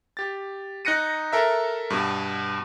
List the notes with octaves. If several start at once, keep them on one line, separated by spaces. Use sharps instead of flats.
G4 A6
D#4 F#6 A#6 C#7 D#7
A4 A#4 E5
G2 B2